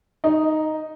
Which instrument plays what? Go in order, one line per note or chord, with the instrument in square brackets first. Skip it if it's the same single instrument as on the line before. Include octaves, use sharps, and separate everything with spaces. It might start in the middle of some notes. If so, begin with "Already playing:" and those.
[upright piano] D#4